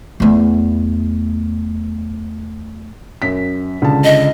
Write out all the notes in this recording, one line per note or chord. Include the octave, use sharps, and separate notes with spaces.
E2 A3
F#2 B6
C#2 D3 A5
D#5